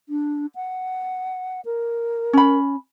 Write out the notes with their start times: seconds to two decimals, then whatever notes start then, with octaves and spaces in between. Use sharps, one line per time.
0.09 D4
0.55 F#5
1.65 A#4
2.33 C#4 B5